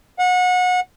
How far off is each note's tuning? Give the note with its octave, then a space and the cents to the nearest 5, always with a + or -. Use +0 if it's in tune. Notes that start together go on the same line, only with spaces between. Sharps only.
F#5 -30